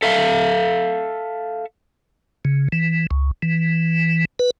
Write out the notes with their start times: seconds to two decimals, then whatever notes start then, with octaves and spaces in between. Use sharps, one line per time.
0.03 A4 E5 F5
2.45 C#3
2.72 E3
3.11 C#2
3.42 E3
4.39 B4